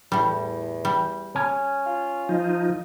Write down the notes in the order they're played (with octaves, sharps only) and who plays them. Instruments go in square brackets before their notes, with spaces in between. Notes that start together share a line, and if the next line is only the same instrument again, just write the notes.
[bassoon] E2 [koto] A2 G3
[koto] G3
[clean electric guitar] C#4
[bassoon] F4
[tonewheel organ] F3 D#4